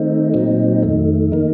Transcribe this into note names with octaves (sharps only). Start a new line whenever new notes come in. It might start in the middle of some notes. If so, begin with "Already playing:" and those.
Already playing: D#3 A3 C4 D#4
A#2 F#3 C4 D#4
F2 D#3 A3
D#3 A#3 D#4